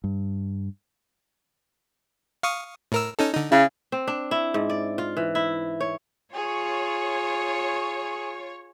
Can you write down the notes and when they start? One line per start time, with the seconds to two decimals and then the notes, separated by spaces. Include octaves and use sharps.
0.04 G2
2.43 F5 C#6 D#6
2.92 A2 A#4 E6
3.19 C#4 D#4 A4
3.34 D3 D#4
3.52 C#3 E4
3.92 C4
4.07 D4
4.31 E4
4.54 G#2
4.70 D5
4.98 F4
5.17 E3
5.35 E4
5.80 C#5
6.34 F4 G#4 C#5